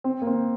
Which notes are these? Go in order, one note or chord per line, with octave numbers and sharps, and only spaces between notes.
C4
A#3
C4